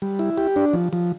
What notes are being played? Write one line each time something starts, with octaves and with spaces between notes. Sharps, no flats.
G3
E4
G4
D4
F3
F3